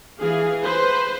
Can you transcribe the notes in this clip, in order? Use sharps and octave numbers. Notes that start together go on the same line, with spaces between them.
E3 G#4 F5
B4 C5